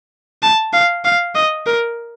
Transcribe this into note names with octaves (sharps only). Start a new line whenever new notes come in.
A5
F5
F5
D#5
A#4